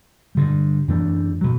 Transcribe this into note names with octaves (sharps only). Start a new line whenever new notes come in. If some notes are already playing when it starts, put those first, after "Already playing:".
G2 D3 G3
F#2 E3 A3 D4
B2 F#3